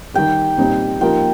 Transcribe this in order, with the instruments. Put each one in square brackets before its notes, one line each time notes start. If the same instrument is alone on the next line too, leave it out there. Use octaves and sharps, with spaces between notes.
[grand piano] D#3 G3 D#4 G4 [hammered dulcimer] G5
[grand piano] A#2 G3 C4 D#4
[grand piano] F3 A#3 D#4 G4 A#4 [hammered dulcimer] G5